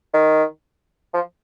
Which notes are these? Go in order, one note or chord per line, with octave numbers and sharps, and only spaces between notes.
D#3
F3